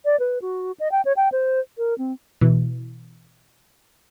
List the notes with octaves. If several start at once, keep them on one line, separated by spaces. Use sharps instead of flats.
D5
B4
F#4
D#5
G5
C#5
G5
C5
A#4
C4
B2 E3